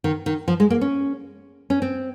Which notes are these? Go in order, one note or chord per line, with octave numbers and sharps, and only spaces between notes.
D#3
D#3
F3
G#3
A#3
C#4
C#4
C4